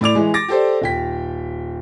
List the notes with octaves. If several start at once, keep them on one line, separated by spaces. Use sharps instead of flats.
A2 D5 D6 F7
E3 G#3
D6 A6 A#6
G4 A4 C5 D5
D#1 G5 B6